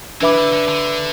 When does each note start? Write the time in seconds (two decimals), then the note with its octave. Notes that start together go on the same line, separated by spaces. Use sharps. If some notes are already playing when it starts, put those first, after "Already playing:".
0.21 E3 D4 B4 E5 B5 D6
0.37 D3
0.53 D3
0.68 D3